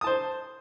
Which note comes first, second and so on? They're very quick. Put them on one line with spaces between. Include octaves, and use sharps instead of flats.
D#6 A5 C5